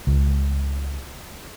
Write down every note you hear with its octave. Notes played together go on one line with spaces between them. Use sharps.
C#2